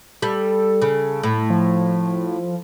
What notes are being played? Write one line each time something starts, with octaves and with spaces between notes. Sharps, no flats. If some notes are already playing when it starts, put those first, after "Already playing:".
G3 A4
C#3
A2
F3